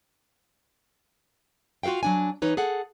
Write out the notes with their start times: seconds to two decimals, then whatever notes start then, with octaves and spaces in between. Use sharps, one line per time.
1.83 F4 F#4 A#4 F5 G5
2.03 F#3 D4 G#5
2.42 E3 D#4 B4 C#5
2.57 G#4 A4 F#5